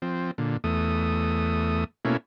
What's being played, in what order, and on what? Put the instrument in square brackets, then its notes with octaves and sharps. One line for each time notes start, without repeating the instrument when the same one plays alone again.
[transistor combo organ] F3 C4
A#2 D3
E2 A3 D#6
B2 A3 A#3 C#4 E4